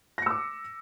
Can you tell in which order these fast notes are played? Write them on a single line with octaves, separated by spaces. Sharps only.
A#6 C#7 E6 D6